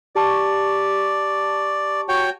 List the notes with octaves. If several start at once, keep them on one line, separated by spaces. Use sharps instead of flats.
G4 D5 A5 C#6
F#4 C#5 G5